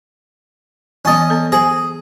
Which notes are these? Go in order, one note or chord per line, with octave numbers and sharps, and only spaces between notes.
E3 B3 C#4 D#5
B3 A4
G#4 C5 G#5